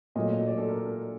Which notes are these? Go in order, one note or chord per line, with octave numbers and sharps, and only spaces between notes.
A#2 F#3 A3 D#5
D5
D5
A4
A#4